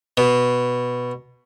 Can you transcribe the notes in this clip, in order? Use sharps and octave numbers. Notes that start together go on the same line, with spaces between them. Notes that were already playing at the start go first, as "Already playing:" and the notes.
B2